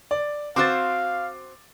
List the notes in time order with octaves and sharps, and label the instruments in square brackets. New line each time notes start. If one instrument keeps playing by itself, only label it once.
[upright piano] D5
[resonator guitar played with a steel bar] C4 F#4 C5 [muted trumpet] F5 [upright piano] D6 A6